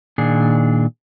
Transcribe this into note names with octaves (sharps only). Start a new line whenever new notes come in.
A#2 D#3 D4 G#4